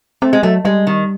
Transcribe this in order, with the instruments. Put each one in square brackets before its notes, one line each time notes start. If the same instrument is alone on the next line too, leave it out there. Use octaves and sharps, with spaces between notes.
[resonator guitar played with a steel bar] A3 [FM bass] C4
[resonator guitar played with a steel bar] G#3
[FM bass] F#3 [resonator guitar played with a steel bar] A3
[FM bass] G3 [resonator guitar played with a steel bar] G#3
[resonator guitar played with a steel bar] D#3